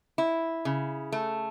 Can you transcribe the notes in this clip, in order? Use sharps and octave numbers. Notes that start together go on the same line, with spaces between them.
E4
C#3
A3